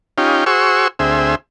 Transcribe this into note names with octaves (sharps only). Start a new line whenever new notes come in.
C#4 D#4 F4 G4
F#4 G#4 C5 C#6 E6
D2 C4 G#4 E5